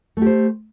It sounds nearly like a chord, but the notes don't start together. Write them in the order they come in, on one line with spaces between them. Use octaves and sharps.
A3 G4 C5